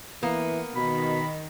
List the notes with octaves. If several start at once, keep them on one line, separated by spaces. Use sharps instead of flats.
E3 A#3 B3
B2 D#3 B5